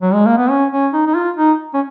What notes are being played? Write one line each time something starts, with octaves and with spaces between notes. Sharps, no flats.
F#3
G#3
A#3
B3
C#4
C#4
D#4
D#4
F4
D#4
C#4